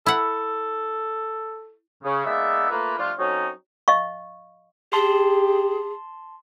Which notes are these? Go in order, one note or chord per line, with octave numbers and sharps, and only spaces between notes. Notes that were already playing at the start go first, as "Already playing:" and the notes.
E4 A4 F#5
C#3
G#3 A#3 B3 D#4 D5 E5
A3 A#3 F4 B4
F3 G3 A3 D4 F4
F#3 C4 C#4 D#4 A4 C#5
D#5 F5 C#6
G4 G#4 A5 C6